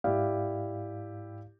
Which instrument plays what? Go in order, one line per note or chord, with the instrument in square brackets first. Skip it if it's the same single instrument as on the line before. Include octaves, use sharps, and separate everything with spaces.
[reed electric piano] G#2 F5 [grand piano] E4 G4 D5